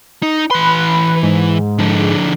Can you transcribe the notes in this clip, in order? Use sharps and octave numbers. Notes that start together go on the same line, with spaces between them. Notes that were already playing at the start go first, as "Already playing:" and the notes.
D#4
E3 B4 C6
G#2
D3 F3